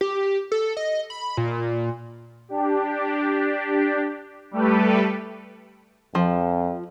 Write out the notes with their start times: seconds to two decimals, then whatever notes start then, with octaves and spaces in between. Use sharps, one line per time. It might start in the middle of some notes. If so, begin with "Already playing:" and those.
0.01 G4
0.52 A4
0.77 D#5
1.10 B5
1.37 A#2
2.49 D4 G4
4.51 G3 A3 G4 A4 B4
6.15 F2 F3